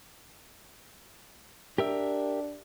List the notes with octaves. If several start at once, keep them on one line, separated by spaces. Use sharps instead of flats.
D4 G4 A#4 E5